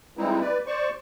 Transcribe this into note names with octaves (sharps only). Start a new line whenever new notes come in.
E3 G3 G#3 C4 D#4 E4
B4 D5
C5 D5 C#6